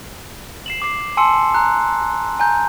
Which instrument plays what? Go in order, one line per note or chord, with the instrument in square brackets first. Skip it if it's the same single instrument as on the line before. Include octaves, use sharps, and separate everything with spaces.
[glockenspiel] C7 E7 F#7
D6 C7
G#5 A5 C6 E6 C#7
A#5 F#6
G#5 A#5 G6